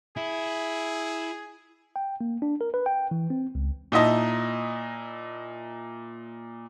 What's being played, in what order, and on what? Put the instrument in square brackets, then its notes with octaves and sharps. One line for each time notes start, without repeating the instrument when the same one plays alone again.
[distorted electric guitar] E4 [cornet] G#4
[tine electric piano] G5
A#3
D4
A#4
B4
G5
E3
C4
C#2
[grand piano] A#2 D#4 E4 D#5 A5